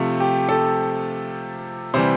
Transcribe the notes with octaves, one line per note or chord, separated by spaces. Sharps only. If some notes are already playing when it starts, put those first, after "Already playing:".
Already playing: C3 F3 A3 F4
G4
A4
C3 E3 G3 C5